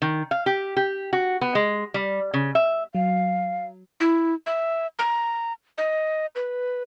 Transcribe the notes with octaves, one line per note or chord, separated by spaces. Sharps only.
D#3
F5
G4
G4
F#4
B3
G#3
G3
C#3
E5
F#3 F5
E4
E5
A#5
D#5
B4